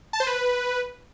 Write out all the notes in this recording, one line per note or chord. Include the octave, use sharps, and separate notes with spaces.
A5
C5
B4